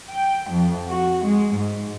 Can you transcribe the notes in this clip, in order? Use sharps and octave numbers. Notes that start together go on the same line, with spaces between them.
G5
F2
F#4
G#3
G#2